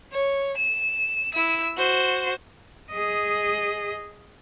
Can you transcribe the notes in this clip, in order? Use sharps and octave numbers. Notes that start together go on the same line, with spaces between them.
C#5
E7
E4 E6
F#4 C5
G#4 D#5